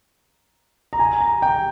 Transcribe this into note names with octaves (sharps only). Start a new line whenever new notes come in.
A#5
G#5
A#5
G5